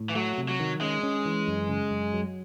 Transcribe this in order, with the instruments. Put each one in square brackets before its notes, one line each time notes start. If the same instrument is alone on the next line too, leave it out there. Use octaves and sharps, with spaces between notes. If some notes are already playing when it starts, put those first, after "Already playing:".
Already playing: [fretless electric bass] A2
[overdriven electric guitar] E3
[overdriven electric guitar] F#3 [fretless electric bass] A3
[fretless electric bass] C3
[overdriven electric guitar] F#3
[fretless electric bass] D#3
[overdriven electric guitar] G#3 [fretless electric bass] C#4
[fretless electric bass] C#4
E3
F#2
C#3
F#2
F#3